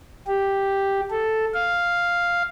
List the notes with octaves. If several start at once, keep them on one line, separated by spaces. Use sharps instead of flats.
G4
A4
F5